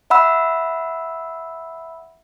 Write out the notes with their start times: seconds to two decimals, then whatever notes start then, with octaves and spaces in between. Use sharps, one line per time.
0.10 E5 F#5 B5 E6